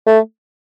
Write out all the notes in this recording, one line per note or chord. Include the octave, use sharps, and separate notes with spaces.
A3